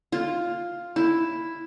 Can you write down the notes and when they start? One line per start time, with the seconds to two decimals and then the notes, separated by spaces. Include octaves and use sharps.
0.12 F4
0.96 E4